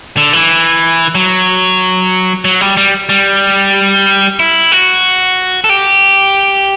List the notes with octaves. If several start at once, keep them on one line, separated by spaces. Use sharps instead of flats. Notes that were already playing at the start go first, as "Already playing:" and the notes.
D3
E3
F#3
F#3
G3
G3
G3
E4
F#4
A4
G4